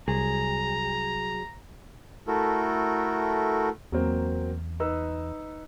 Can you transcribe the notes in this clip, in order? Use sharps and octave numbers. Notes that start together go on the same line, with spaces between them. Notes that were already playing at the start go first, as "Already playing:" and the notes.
C2 F#3 G#4 A#5
A3 E4 F#4 A4 A#4
E2 F#3 A#3 C4
D#4 B4 E6